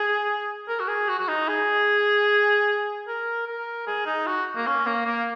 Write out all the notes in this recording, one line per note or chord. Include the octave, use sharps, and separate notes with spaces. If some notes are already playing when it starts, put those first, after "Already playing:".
Already playing: G#4
A#4
F#4
G#4
F#4
F#4
D#4
G#4
A#4
A#4
G#4
D#4
F#4
A#3
C#4
A#3
A#3